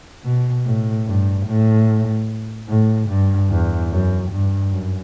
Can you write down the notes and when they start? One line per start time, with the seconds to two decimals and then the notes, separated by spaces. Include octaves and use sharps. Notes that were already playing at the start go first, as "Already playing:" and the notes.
0.24 B2
0.65 A2
1.06 G2
1.46 A2
2.68 A2
3.09 G2
3.50 E2
3.91 F#2
4.31 G2
4.72 F#2